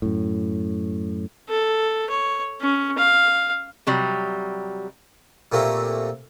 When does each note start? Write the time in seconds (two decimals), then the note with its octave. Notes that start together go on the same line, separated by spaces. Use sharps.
0.02 F#2 A2
1.49 A4
2.11 C#5
2.61 C#4
2.98 F5
3.87 C3 F#3 G3
5.52 A#2 A3 A#3 C4 G4